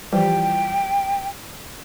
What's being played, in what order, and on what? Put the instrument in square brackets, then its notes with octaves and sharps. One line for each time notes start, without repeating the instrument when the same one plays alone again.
[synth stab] E3 F3 G3 [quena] G5